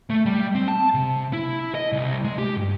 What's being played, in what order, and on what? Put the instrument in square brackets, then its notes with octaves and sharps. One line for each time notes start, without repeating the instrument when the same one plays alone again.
[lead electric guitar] A3
G3
C4
A5
C3
E4
D#5
C2
G#3
G4
G2